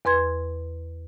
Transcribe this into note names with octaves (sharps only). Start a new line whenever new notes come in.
E2 B4 C6 G#6